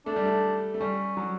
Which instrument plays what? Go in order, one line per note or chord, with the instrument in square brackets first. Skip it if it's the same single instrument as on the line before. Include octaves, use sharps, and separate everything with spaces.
[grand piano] A3 [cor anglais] D4
[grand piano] G3
A3
A3
[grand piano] G3 [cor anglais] C#4
[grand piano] F#3